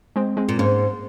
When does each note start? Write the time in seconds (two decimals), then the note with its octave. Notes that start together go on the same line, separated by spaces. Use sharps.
0.16 G#3 C4
0.37 G#3 C4
0.49 A#2
0.59 G#2 A#3 C#4